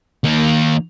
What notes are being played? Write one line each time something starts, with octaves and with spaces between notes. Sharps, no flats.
D#3 A#3